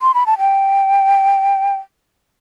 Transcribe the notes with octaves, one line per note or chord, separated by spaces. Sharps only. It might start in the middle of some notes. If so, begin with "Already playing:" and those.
C6
B5
A5
G5